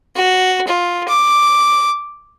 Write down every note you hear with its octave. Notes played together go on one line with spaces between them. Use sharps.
F#4
F4
D6